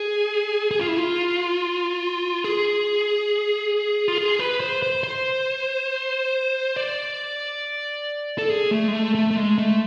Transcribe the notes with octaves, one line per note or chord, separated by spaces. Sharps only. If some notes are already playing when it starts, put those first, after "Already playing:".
Already playing: G#4
G#4
F4
E4
F4
G#4
F4
G#4
B4
C5
C5
C5
D5
A4
G#4
A3
G#3
A3
A3
A3
G#3
A3